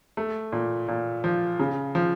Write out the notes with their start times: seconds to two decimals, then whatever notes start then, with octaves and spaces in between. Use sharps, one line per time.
0.17 A3
0.52 A#2
0.88 A#2
1.24 F3
1.59 C#3
1.95 F3